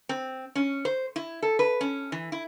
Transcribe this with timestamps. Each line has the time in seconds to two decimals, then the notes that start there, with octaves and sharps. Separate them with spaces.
0.09 C4
0.55 C#4
0.85 C5
1.16 E4
1.42 A4
1.59 B4
1.81 C#4
2.12 E3
2.32 E4